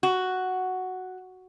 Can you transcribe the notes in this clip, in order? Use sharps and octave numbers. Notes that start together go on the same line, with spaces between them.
F#4